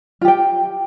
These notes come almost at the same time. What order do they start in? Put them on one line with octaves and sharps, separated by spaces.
F4 G4 G5